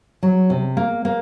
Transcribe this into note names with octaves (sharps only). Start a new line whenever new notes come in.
F#3
C3
A#3
A#3